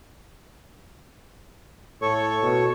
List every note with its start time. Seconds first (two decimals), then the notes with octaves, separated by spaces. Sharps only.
2.02 A2 A4 C#5 C#6
2.42 B2